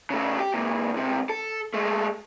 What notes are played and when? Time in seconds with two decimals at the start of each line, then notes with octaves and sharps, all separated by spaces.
0.10 C#3 A3
0.39 G4
0.54 C#2 A#2
0.93 C#2 C3
1.29 A4
1.74 G#3 A3